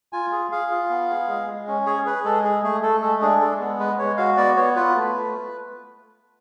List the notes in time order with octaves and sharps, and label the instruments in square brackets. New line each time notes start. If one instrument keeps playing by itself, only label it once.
[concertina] F4 G#5
G#4
G#4 F5
F4
B3
G#4
G#3
G#3
C#4
G#4 C#5
G#4 B4
G#3 A4
G#4
A3 G#4
A3 A4
G#3 A4
D4 G#4
G#3 A4
B3
G#3 B4
G#3 C#5
F#4 F5
B3 D5
B3 C#5
F4 B4
A3
A3